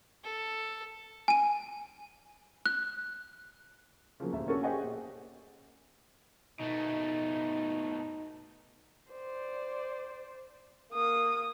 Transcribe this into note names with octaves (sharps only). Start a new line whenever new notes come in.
A4
G#5 D#7
F#6
C#3 F3 F#3 A#3
D#1 D2 E5
A#3 C#4 D4 F#4 A4 C#5
G4 G#4 C5 D#5 F#5 G#5
A#2
B2 A3 D#4
C5 D5
A#3 D#6